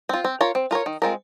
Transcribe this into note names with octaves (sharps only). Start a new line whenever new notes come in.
C4 F4
C4
F4 A#4 C#5
C4
F4 A#4 C#5
D#3
G#3 C4 F4 A#4